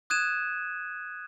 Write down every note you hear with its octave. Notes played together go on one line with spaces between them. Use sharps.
D#6 F#6 G#6 D#7 E7